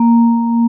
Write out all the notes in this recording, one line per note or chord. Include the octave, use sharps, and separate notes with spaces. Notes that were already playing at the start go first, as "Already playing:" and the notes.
Already playing: A#3